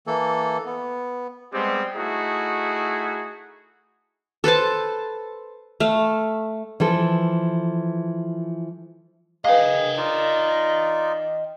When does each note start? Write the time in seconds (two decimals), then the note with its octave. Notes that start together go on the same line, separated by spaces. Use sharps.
0.07 E3 A#3 A4
0.66 B3
1.52 G3 G#3 B3 C4 G4
1.95 A3 D#4 E4 F#4 G#4
4.44 A4 B4 C5 A5
5.80 A3 F5
6.80 E3 F3 A4
9.45 G#4 B4 D#5 F5 G5
9.97 D#4 F4 D5